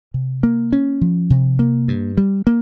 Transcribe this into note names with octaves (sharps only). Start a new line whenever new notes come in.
C3
A#3
C#4
F3
C3
A#3
G2
G3
A#3